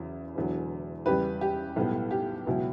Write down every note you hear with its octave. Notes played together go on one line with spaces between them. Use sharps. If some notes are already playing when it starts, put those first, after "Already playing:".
Already playing: E2 C#3 F#3 E4
E1 E2 D3 F#3
E2 C#3 G3 G4 B4
G4
B1 A2 G3 B3
G4
C#2 B2 F#3 B3 E4